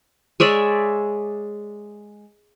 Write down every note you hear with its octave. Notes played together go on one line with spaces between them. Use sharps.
G#3 C#5 D5 E5